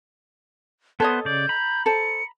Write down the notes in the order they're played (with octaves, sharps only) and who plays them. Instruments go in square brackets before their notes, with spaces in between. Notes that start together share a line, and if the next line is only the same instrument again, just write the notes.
[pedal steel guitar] B3 C5 [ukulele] A4 C#5 D#5 [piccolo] F#6
[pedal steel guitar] C#3 D5 [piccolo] G6
[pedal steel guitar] A#5 B5
[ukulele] A4 C5 [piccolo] C#7